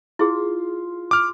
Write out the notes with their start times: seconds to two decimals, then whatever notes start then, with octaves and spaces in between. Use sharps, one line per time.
0.19 E4 F4 G#4
1.11 D6 F6